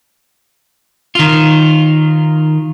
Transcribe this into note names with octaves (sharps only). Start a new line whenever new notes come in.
D#3 F4